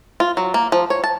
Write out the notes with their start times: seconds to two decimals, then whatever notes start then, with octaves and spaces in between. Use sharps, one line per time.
0.20 F4
0.37 F#3
0.54 A#3
0.72 F3
0.90 C#5
1.04 A5